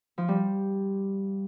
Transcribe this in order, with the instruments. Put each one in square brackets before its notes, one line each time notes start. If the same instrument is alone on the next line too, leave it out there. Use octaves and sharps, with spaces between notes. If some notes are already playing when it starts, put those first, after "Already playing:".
[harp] F3
G3